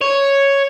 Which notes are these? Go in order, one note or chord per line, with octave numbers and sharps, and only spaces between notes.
C#5